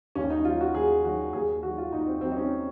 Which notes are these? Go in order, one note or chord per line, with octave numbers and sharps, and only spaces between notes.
D#2 C#4
D#4
D#3 F#3 F4
F#4
D#2 G#4
D#3 F#3 F#4
D#2 G#4
D#3 F#3 F#4
F4
D#2 D#4
C4
D#3 F#3 C4
D#4
C#4